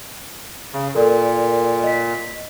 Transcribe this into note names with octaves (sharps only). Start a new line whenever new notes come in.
C#3
A#2 A4 A#4 D5
D#5 B6